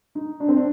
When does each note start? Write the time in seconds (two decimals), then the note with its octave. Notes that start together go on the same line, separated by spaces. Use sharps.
0.15 D#4
0.40 D4
0.48 C4
0.57 D4